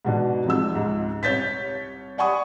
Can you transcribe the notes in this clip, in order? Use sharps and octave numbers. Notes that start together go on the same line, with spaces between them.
G#2 B2 D4
F1 F2 G#2 E6
C#2 G#2
C2 C#5 G6 A6 B6
D5 F#5 G#5 B5 C#6 D#6